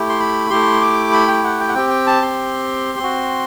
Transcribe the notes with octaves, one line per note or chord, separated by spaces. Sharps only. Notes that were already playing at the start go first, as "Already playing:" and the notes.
Already playing: A3 E4 G4
C6
B5
A3 E4 G4 C6
D6
B5
G5
F#5
G5
F#5
C4 G4 G5
G5
A5
C6
C4 F#4